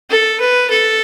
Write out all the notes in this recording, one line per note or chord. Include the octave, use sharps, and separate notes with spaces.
A4
B4
A4